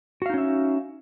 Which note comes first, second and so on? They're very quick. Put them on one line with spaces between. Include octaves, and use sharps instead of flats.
F#4 F5 D#4 C#4 E5